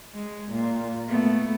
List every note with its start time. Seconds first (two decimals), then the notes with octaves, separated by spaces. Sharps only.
0.14 G#3
0.51 A#2
1.09 A3 B3